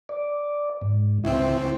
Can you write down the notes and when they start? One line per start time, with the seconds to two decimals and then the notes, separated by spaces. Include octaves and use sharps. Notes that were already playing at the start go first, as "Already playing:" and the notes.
0.09 D5
0.81 G#2
1.24 C#2 C4 E4